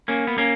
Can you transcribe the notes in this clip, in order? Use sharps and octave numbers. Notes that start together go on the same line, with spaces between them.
A#3 C#4
B3
A#3 C#4